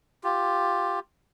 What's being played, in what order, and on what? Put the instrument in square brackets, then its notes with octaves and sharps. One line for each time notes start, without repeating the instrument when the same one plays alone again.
[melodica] F4 G4